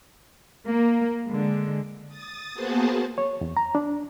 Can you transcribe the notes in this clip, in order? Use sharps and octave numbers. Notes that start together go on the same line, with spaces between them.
A#3
D3 G#3
D#6 A6
A#3 B3 F#4 G#4 C5 A5
C#5
E2
A#5
D4